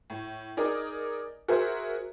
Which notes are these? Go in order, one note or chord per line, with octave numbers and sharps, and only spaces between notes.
A2
D#4 G#4 A#4 D5 D#5
F#4 G#4 A#4 C5 E5